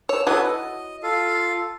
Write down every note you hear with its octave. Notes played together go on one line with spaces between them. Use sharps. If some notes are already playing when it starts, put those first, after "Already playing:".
C#5 E6
E3 F#3 F#4 A4 B4 D#6
D#5
F4 A4 F5